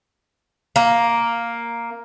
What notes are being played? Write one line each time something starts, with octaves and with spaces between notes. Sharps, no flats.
A#3